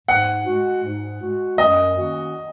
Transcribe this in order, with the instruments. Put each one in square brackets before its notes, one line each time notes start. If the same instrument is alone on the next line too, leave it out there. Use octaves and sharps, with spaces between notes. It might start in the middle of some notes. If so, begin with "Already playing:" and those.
[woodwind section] G#2 [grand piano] F#5
[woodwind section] G#3 F#4
G#2
G#3 F#4
[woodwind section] F#2 [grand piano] D#5
[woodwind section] D#3 A#3 C#4 F#4